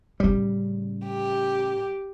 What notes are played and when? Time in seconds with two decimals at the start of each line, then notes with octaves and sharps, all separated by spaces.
0.20 A2 C#3 G3
1.06 G4